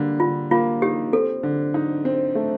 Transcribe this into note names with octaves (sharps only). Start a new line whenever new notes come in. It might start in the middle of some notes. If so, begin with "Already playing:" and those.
Already playing: D3 G3 A#3
D3 F4
A#3 F4
D#4 G4
C4 A4
D3
D#4
C4
A3